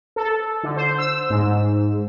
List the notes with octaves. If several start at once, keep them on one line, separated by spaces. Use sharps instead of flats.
A4
D3
C5
E6
G#2